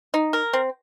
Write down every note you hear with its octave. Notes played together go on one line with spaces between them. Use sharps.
D#4
A#4
C4